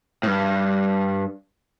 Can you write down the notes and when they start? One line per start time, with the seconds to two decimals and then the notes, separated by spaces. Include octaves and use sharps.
0.23 A2
0.27 G2